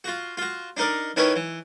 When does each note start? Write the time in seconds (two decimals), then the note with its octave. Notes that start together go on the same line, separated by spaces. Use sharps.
0.04 F4 F#4
0.37 F4 F#4
0.77 D4 D#4 A#4 D5
1.16 D#3 C#4 D#4 E4 B4 C#5
1.36 E3